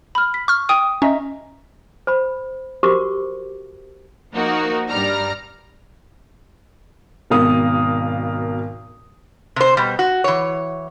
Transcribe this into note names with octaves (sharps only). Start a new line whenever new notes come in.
B5 F6
B6
C#6 F6
G5 D#6 D#7
C#4 D#5 E5 A#5
C5 B5
F#4 G4 A#4 C5 C#6 D6
F3 A#3 D#4 F#4 A#4
G2 G3 D5 A#5 F6
G#1 B2 A#4 F5 D#6
C3 C5
B2 G3
F#4
E3 C#5